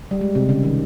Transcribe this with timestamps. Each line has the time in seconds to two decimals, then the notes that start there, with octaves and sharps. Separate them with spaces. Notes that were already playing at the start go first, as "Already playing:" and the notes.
0.11 G3
0.21 G#3
0.35 C3
0.49 C#3
0.63 D#3